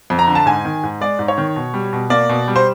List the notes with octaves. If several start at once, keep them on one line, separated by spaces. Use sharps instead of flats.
F2
A#5
D3
A5
G#2 G#5
D#3
G#2
G#3 D5
G#2
C#5
D#3
B2
G3
B2
A#3 D5
B2
G3
C5